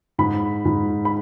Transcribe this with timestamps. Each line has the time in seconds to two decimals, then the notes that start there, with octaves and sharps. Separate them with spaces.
0.19 G#2 B5
0.65 G#2
1.05 B5